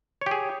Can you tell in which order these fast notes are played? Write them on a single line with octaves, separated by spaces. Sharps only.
C#5 G4 G#4